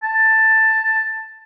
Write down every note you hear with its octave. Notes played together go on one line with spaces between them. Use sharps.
A5